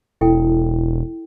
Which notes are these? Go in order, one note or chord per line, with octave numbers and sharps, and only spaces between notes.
E1 E4 A4 G5